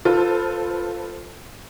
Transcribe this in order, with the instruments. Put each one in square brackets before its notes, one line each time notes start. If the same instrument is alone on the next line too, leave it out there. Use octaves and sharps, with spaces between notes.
[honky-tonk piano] F4 A4 B4 C5